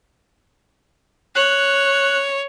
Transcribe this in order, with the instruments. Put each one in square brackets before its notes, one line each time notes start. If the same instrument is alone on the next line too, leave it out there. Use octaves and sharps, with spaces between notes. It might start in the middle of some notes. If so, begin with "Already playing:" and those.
[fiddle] C#5 [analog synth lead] F#6